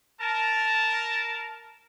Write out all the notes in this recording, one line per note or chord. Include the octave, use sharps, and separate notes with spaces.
A#4 A5